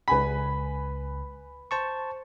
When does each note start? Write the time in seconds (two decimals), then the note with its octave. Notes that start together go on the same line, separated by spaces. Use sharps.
0.08 C#2 B4 G#5 B5 B6
1.71 C5 A5 C#6